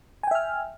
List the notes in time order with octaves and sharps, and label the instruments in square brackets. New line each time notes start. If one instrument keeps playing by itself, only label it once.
[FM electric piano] G#5
G5
E5
F6